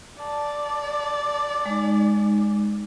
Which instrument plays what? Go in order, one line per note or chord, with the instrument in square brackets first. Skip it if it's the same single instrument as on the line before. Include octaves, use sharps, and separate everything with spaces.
[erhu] D5 [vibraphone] A5
[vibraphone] G#3 D#4